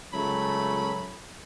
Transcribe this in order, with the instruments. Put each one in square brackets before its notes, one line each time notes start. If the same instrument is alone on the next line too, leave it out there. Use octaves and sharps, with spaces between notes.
[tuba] C#2 [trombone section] C#3 A3 [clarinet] F#3 [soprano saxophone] B5